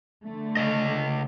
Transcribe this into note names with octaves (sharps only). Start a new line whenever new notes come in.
D3 A3
C#3 D#5